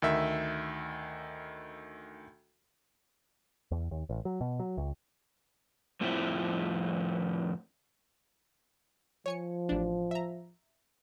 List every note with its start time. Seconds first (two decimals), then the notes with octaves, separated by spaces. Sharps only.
0.02 D2 D#3 E5
3.71 E2
3.91 D#2
4.09 A1
4.25 F#3
4.41 B2
4.59 F#3
4.77 C#2
6.01 F2 A2 F3 C4 E4
9.26 F3 C#5 G#5 C#7
9.69 A1 D4
10.11 E5 A#5